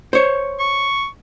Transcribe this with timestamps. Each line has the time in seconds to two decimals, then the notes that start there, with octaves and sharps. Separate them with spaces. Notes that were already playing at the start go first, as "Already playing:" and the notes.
0.13 C5 C#5
0.60 C#6